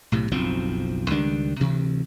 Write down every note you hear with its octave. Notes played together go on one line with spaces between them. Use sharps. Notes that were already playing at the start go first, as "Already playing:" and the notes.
B1 A2 C3
F#1 B1 F3 C4
C#2 D#3 G3 D4
D2 C3 E3